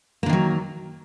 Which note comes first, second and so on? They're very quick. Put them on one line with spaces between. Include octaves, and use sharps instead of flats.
A#3 D3 D#3 F#3